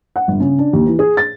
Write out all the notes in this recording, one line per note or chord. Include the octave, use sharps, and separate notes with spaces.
F#5
G1
C#3
D4
D#2
E3
G#4
A6